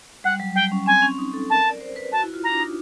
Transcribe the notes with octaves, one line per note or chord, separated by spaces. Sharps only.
G3 F#5
F#3
G3 G5
C#4
C4 G#5
C#4
D#4
A4
A#4 A5
D5
C5
B4
F#4 A5
E4
F4
A#5
D4
D#4